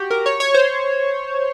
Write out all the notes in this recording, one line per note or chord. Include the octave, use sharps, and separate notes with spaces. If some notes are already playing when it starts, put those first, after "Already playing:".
Already playing: F#4 G4
A#4
C#5
C#5
C5